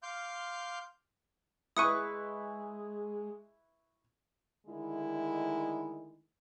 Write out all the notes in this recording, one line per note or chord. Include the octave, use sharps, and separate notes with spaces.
F5 C6 D6 F6 G6
G#3 E4 B4 C#6 D#6 C#7 D#7
D3 D#3 G#3 A3 D#4 E4